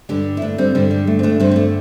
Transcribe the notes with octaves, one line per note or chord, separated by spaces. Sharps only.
G2 D3 D4 G4
E4
A3 D4
G3 C4
G2 D3 G3
G3
A3
C4
A3 D4
G2 D3 G3 C4
G3
A3